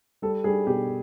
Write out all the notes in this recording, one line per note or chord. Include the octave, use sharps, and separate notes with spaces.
G3 A4
G3 G#4
B2 G4